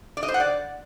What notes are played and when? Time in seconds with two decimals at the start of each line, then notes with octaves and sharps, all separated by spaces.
0.17 D5
0.23 D#5
0.28 C5
0.34 F#5
0.40 D5